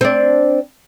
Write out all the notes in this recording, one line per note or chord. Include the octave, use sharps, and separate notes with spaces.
C4 D4